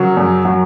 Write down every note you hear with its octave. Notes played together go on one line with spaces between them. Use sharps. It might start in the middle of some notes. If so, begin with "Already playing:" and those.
Already playing: C#3 F#3 A#4
F#2
F#3